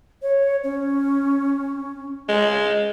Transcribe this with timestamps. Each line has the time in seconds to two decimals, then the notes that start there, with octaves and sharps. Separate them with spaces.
0.22 C#5
0.63 C#4
2.29 G#3